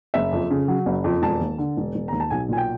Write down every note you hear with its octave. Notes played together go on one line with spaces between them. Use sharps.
F#1 E5
F2
C#3
F#3
F#1
F2
E1 A5
D#2
D3
E1
E1
D#2 A#5
A5
B1 G#5
A#2 G#5
G5